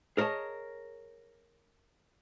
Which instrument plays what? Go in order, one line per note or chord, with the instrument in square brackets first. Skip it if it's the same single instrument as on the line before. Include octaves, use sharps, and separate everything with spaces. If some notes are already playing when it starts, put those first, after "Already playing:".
[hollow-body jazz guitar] G#4 A#4 C#5 D#5 A5